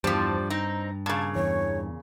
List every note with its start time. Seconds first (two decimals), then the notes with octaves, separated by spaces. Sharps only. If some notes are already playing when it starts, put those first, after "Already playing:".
0.04 E2 G2 F3 G3 C5 A5
0.50 C4 D#4 A#5
1.06 A#2 C#3 A5 G#6
1.35 E2 C#5